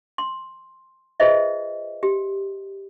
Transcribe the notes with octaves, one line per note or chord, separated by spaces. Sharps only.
C6
F4 G#4 B4 C5 D#5 E5
G4